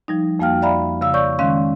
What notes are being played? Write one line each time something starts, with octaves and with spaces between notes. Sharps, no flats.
F3 G3 D#4
F2 A#3 F#4 F5 G5 F6
D5 E5 F5 A#5 B5
C#3 F5 E6
C#5 D5 C#6 G6
D#3 G#3 C#4 F5 C6